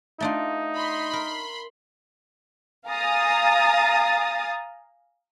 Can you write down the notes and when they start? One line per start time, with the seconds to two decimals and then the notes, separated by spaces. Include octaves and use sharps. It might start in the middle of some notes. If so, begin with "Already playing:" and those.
0.20 A3 D4 D#4 F4
0.75 B5 C6
1.13 A#4
2.88 F5 G#5 A#5 D#6 A6